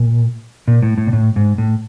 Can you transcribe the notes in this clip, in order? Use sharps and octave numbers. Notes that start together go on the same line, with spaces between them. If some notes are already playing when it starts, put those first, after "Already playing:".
Already playing: A#2
A#2
A2
A2
A#2
A2
G#2
A2